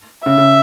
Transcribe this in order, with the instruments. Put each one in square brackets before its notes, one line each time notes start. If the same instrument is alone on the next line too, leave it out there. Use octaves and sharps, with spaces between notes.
[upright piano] C#3 [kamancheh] E5
[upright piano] C#3